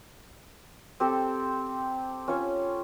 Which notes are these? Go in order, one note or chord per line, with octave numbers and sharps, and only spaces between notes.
C4 G4 A4 C5
C#4 F4 C5 C#5